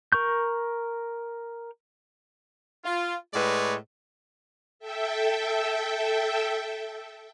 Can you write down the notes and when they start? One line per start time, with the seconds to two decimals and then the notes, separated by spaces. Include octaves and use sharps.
0.12 A#4 C#6 G6
2.84 F4
3.34 A2 G#3 B4 C#5 D5
4.79 A4 E5 G5